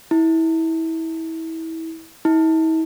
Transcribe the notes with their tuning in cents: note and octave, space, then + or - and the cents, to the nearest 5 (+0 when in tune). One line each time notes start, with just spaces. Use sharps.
E4 -25
E4 -45